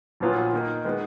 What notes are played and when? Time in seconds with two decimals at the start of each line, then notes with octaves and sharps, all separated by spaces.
0.20 A#1 A#2 F#3 B3 F4
0.52 D#3 A#3 D#4
0.84 D#3 G#3 B3